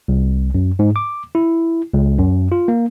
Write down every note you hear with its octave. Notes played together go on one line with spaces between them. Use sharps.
C2
F#2
G#2
D6
E4
C#2
F#2
F4
A#3